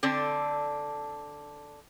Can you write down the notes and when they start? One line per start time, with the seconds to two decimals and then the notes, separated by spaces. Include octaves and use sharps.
0.03 D3 C4 D4 A4